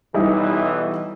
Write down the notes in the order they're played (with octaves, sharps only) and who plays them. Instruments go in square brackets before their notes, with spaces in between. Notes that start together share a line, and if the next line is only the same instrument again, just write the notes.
[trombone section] B1 E3 [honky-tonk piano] G3 D#4 E4